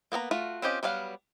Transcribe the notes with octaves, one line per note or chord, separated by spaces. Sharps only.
A#3 B3 A4 A#5
A3 F4 F#4
C4 C#4 F4 G4 D#5
F#3 G3 B3 F5 F#5